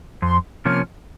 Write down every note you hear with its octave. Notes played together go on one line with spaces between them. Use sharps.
F2 C6
C3 F3 A#3 C#4 F6